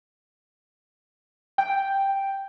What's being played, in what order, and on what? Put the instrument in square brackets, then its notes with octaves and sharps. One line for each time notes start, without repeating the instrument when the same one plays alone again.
[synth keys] G5